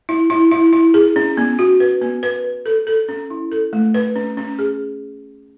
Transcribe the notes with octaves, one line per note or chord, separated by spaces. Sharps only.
E4
E4
E4
E4
G#4
C#4
B3
F#4
B4
B3
B4
B4
A4
A4
C#4
E4
A4
A3
B4
C#4
C#4
G#4